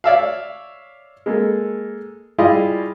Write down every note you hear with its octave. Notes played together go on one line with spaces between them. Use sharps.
C#5 D5 E5 F5
G#3 A#3 A4
G3 E4 F4 G#4 D#5 F5